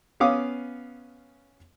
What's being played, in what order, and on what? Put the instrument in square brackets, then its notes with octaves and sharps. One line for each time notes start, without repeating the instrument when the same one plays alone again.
[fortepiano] B3 C#4 F5 D6 D#6